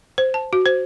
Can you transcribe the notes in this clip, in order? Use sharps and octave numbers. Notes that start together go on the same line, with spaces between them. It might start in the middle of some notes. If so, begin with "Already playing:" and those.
C5
A5
F#4
C5